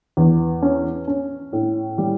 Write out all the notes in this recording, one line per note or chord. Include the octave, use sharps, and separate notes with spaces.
E2
C#4
C#4
A2
G3